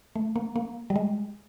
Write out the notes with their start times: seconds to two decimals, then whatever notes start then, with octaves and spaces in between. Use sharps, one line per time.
0.16 A3
0.36 A#3
0.56 A#3
0.90 G3
0.96 G#3